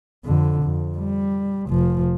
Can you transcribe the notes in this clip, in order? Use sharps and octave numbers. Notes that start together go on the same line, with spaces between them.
F2 D3
F2
G3
F1 F3